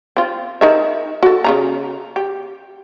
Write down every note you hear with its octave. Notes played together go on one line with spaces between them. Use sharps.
C4 F4
D#4 A#4 E5
F#4 A4
C#3 E3 A#5
G4